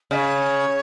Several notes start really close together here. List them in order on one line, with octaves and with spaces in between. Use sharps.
C#3 D#5 C#5